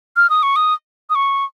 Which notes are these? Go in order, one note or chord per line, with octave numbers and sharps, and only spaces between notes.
F6
D#6
C#6
D#6
D#6
C#6